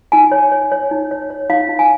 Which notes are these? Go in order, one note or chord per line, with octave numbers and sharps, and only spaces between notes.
D#4 G#5
C#5
C#5
C#5
D#4
C#5
C#5
D#4 F5
D#4
G#5